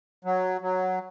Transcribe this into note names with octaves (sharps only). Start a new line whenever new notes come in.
F#3
F#3